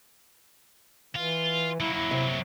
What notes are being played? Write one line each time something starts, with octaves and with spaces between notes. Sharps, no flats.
E3 F4
F#3 A#3 E4
E4
C3